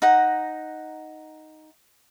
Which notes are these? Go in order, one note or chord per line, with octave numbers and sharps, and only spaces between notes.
D#4 F#5 A#5